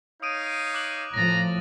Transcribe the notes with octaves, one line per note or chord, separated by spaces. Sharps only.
D#4 C#5 F5 D#6 D7 D#7
D6 F#6 F#7
A2 F3 A#5 A6 A#6